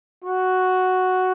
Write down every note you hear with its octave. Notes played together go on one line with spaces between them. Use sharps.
F#4